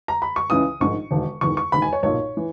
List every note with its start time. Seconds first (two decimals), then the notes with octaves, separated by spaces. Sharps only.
0.08 A#5
0.22 B5
0.36 C#6
0.50 C#2 C#3 E3 D#6
0.80 A#1 G#2 D#3 C#6
1.11 E1 D#2 D#3
1.41 E1 E2 D#3 C#6
1.57 C#6
1.72 E1 D#2 D#3 B5
1.82 G#5
1.93 C#5
2.03 B1 A#2 C#5
2.37 E3